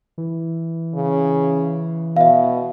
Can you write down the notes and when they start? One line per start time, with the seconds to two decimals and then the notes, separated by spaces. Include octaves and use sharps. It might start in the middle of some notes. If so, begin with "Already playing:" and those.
0.18 E3
0.95 C#3
2.17 B2 E5 F5